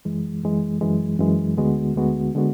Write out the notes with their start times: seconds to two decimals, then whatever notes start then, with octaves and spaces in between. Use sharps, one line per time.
0.05 F#2 E3 G#3
0.43 F#2 E3 G#3
0.81 F#2 E3 G#3
1.19 F#2 E3 G#3
1.57 D2 D3 G#3 B3 F#4
1.96 D2 D3 G#3 B3 F#4
2.35 D3 G#3 B3 F#4